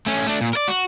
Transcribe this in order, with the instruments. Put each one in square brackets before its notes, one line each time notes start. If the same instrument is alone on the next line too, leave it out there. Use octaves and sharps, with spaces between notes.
[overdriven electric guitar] A3 C#4
A3 D4
A#2
A#4 D5
F#4